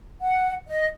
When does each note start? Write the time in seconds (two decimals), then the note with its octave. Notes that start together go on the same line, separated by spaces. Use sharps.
0.21 F#5
0.68 D#5